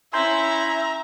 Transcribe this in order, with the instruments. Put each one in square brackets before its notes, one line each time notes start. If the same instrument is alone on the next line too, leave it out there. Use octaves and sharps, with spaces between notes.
[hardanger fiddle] C#4 E4 [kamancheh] E5 [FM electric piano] G#5 C6 G6 [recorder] A#5